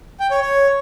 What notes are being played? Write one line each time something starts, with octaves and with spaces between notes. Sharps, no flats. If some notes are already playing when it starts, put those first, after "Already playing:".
G5
C#5
C#5